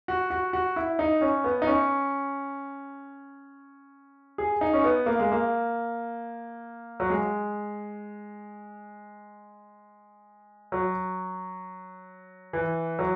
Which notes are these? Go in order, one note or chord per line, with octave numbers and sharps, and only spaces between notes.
F#4
F#4
F#4
E4
D#4
C#4
B3
D#4
C#4
G#4
D#4
C#4
B3
A#3
G#3
A#3
F#3
G#3
F#3
E3
F#3